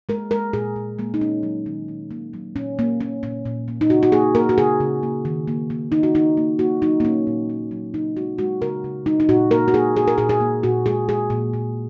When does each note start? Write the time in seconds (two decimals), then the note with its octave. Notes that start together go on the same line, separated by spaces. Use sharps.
0.09 G#3 A#4
0.31 G#3 A#4
0.53 A#2 G#4
0.76 A#2
0.99 G#3 A#3
1.14 D#4
1.21 A#3 C#4
1.43 F#3
1.66 D#3
1.88 D#3
2.11 A#3
2.33 F#3
2.56 A#2 C#4
2.79 A#3
3.00 A#3 C#4
3.23 A#2 C#4
3.46 A#2
3.68 A#3
3.81 D#4
3.90 C#3 F#4
4.03 F#4
4.12 A#3 G#4
4.35 A#3 A#4
4.49 F#4
4.58 C#3 G#4
4.80 C#3
5.03 A#3
5.25 D#3
5.48 A#3
5.70 A#3
5.92 D#3 D#4
6.03 F#4
6.14 D#3 D#4
6.37 A#3
6.59 A#3 F#4
6.82 F#3 D#4
7.00 A#3
7.05 A#2 C#4
7.27 A#2
7.50 A#3
7.71 F#3
7.94 C#3 D#4
8.17 G#3 F#4
8.38 G#3 F#4
8.62 C#3 A#4
8.84 C#3
9.06 G#3 D#4
9.20 D#4
9.29 A#2 F#4
9.51 A#3 A#4
9.68 F#4
9.74 A#3 G#4
9.96 A#2 G#4
10.08 A#4
10.18 A#2 G#4
10.29 G#4
10.40 A#3
10.63 A#2 F#4
10.86 G#3 G#4
11.08 G#3 G#4
11.30 A#2
11.54 A#2